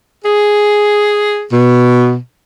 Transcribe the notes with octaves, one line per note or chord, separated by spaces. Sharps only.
G#4
B2